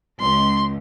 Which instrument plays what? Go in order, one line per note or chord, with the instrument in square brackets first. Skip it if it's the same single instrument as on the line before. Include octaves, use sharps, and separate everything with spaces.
[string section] C#2 [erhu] C6